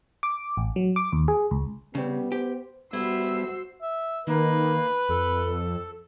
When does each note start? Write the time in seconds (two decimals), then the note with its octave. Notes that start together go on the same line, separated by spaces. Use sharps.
0.23 D6
0.57 A1
0.76 F#3
0.96 D6
1.12 D#2
1.28 G#4
1.51 C#2
1.95 C#3 G3 B3 C4
2.32 G4 C5
2.93 G3 A3 B3 E4 F#4 C5 E6
3.82 E5
4.27 D#3 A#3 B4
5.09 F2 A4